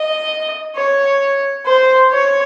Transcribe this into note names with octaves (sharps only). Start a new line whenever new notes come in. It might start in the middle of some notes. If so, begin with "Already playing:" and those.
Already playing: D#5
C#5
C5
C#5